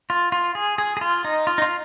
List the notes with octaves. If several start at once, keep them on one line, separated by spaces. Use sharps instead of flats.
F4
F4
G#4
G#4
G#4
F4
D#4
F4
D#4
F4